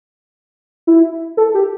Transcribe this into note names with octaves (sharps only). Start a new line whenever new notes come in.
E4
A4
G4